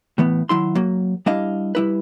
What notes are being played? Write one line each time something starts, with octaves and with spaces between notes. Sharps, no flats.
A2 E3 B3
D#3 F#3 E4 C6
F#3 A#3
G3 D4 E4 D#5 F5
G3 E4 B4